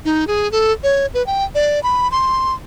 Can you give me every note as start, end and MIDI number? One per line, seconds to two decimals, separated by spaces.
0.05 0.25 63
0.27 0.51 68
0.52 0.72 69
0.83 1.06 73
1.14 1.25 71
1.27 1.44 79
1.55 1.82 74
1.83 2.10 83
2.11 2.54 84